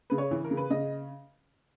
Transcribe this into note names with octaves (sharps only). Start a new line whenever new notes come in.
C#3 B4
C#5
E3
A#4
C#3
B4
C#3 D#5